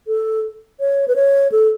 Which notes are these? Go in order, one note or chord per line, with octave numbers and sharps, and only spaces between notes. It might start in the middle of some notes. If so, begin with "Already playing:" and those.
A4
C#5
B4
C#5
A4